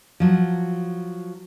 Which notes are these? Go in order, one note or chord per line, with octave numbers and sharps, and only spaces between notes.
F3 F#3